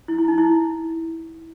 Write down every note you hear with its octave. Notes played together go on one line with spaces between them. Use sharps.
E4
E4
D#4
E4